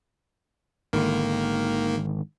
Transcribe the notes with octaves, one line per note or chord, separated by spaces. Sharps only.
G#1 D3 D#3 A#3